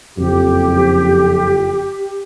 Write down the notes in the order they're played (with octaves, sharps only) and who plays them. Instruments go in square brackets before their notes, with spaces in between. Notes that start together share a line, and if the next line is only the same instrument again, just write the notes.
[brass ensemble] F#1 F2 [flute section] G4